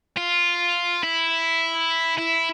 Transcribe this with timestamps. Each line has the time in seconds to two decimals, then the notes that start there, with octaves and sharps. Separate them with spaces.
0.17 F4
1.04 E4
2.18 E4